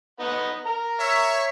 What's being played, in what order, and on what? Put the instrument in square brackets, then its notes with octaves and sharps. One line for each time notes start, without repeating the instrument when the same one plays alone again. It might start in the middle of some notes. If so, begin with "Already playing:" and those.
[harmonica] B3 D#4 F#5
A#4 A#5
[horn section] C#5 E5